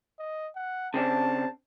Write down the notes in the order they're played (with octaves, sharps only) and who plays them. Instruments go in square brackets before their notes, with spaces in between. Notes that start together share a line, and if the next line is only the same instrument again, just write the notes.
[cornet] D#5
F#5
[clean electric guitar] C#3 C4 D4 [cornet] A5